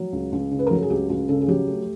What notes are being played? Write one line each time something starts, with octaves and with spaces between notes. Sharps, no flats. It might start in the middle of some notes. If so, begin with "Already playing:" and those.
Already playing: F#3
C#2
C#2
C#3
B4
A#4
F#3 A4
G#4
C#2 G4
C#2 F#4
C#3 A4
G#4
F#3 G4
A3